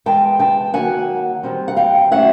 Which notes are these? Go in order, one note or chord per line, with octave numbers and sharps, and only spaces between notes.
E3 G#3 B3 G5 A5
G5 A5
D#3 F#3 A#3 F#5 G#5
D#3 G3 C4
F#5
F5 G5
F#3 A3 C#4 E4 E5 F#5